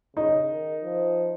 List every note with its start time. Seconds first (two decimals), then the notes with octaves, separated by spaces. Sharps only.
0.16 C#3 D#4
0.51 D#3
0.83 F3